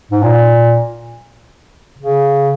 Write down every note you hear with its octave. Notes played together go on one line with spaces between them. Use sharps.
G#2
A#2
C#3